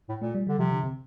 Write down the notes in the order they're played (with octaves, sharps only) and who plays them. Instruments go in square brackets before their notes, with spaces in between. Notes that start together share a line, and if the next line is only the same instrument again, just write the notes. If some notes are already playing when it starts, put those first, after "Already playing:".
[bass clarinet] A2
[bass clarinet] A#2 [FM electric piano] A3
[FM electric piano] G3
[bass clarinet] D3 [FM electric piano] G3
[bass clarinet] C3 [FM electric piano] F3
[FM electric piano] D3
C3